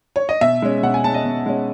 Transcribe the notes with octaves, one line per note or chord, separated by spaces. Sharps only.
C#5
D#5
B2 E5
G#3 C#4
B2 F#5
G#5
G#3 C#4 A5
D#5
B2
G#3 C#4